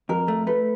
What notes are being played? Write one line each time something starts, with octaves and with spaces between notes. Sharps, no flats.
F2 A#4
A3
A3 B4